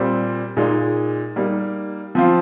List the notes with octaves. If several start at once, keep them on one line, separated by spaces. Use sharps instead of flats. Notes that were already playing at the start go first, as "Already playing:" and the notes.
Already playing: A#2 G3 C4
A#2 G#3 D#4
G3 A#3 D#4
F3 C4 F4